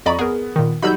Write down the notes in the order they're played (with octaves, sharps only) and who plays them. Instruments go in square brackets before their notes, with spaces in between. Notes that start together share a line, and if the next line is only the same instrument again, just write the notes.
[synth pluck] F2 D5 B5 [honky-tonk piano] D#5 A#5 C#6
[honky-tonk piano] B3 [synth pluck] G#4 A#4
[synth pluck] A#2 D#3
[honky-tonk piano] F#3 G3 D#4 [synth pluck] B5 E6 G6